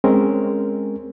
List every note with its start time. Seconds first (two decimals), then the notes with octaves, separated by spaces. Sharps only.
0.04 G#3 C4 C#4 G#4 A#4